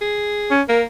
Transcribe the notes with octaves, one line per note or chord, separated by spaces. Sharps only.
G#4
C#4
A#3 A#4